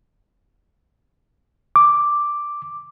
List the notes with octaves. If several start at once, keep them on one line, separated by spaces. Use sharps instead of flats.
D6